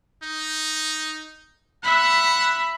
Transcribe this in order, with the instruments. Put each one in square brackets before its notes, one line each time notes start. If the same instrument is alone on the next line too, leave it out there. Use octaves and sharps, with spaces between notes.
[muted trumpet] D#4
[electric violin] E5 B5 [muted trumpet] F#5